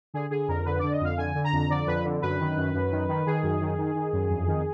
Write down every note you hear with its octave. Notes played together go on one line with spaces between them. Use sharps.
D3 G#4
D3 G#4
F2 A#4
D3 B4
D3 D5
D#5
F2 F5
D3 G#5
D3
A#5
F2
D3 D5
F2 B4
D3
F#2 B4
D#3
F#2
F#2
D#3
D#3
D#3 G#4
F#2
D#3
D#3
D#3
F#2
F2
D#3